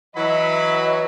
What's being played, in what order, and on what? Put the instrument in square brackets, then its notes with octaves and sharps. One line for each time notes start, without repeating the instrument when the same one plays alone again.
[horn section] E3 F#3 [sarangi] D#5 [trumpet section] E5 B5